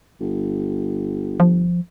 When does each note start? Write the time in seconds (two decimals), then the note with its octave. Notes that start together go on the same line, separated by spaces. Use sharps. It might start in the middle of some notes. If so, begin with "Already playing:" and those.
0.20 G1
1.40 F3